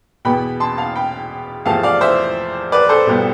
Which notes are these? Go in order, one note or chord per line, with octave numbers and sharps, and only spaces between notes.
E2 B2 B3 G5 B5
A5 C6
F5 A5
G5 B5
E2 C3 F3 A3 F5 A5
D5 F5
C5 E5
B4 D5
A4 C5
C2 B2 G3 B3